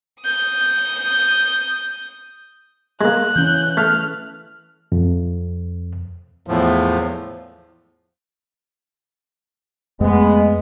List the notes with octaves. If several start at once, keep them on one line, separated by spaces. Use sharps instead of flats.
D#6 G6
G#3 A#3 F#6
E3 C#4 G6
A3 F6
F2
E2 A2 F3
F2 G#3 A3 B3